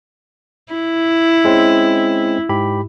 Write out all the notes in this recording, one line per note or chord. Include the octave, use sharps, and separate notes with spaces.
E4
G#3 C4 C#4
G#2 G4 B5